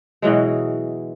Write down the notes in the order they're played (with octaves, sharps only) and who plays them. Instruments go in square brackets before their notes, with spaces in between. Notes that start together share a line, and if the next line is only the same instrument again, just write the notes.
[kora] B2 E3 F#3 G#3